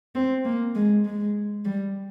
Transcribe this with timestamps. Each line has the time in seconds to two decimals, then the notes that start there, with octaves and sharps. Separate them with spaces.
0.15 C4
0.45 A#3
0.75 G#3
1.05 G#3
1.65 G3